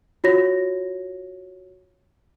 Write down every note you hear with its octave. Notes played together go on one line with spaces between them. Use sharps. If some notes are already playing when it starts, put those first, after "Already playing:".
F4 F#4 C#5 A#6